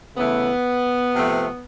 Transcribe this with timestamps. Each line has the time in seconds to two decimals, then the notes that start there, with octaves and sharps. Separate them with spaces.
0.16 C#3 E3 A3 B3
1.13 C3 F3 A3